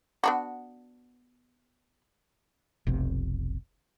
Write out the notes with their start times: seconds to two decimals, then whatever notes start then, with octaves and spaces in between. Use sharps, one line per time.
0.24 B3 D4 F#4
2.87 F1 B1 C3